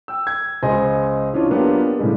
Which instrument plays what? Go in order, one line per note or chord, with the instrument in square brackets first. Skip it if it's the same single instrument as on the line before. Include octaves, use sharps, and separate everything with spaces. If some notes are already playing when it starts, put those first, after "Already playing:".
[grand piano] G5 E6
G#6
C#2 C5 D#5 G#5 C6
E3 C#4 D4 F4
F#3 A#3 B3 D4 F4 G4
A2 C#3 G3 G#3